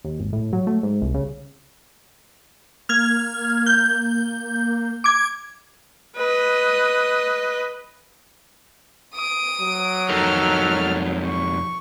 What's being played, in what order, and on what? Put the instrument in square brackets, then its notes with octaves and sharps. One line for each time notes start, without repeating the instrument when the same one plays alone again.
[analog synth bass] D#2
G#1
A2
F#3
A3
G#2
C2
C#3
[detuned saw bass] A#3 [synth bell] F6 G#6
[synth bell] G6
D6 G#6
[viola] B4 D#5
[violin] D#6 D7
[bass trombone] F#3
[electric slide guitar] F2 D#4 A#4 [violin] A4 F6
[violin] C#6